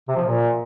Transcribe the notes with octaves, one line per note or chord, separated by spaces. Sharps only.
C3
F3
A#2